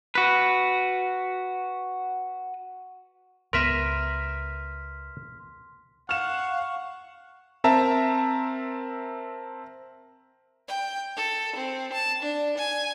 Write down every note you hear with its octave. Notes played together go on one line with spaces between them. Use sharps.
F#4 B4
C#2 B3 A#4 B4 E5 C6 F6 B6
F5 F#5 C#6 F6 E7
C4 A#4 E5 A5 A#5
G5
A4
C4
A5
D4
G#5